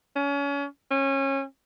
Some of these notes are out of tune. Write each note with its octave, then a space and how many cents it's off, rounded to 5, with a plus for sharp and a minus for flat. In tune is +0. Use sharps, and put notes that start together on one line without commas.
C#4 +30
C#4 -25